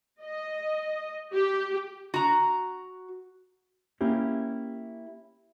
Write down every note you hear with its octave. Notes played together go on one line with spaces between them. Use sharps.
D#5
G4
F#4 A#5
A#3 C#4 E4 G4